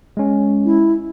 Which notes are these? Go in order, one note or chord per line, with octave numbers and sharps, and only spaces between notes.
G#3 C#4
E4